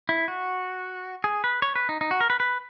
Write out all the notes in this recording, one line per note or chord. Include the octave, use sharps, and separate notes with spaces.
E4
F#4
G#4
B4
C#5
B4
D#4
D#4
F#4
A#4
B4
B4